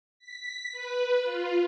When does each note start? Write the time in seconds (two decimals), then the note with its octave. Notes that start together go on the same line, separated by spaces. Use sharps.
0.19 B6
0.72 B4
1.23 F4